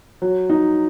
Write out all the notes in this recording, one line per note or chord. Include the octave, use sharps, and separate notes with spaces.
F#3
D#4